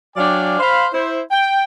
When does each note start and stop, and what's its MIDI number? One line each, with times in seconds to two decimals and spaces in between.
0.16 0.58 54
0.16 0.58 62
0.16 0.58 74
0.16 0.58 77
0.16 0.58 79
0.16 0.58 80
0.59 0.85 72
0.59 0.85 77
0.59 0.85 83
0.92 1.19 64
0.92 1.19 72
1.31 1.64 79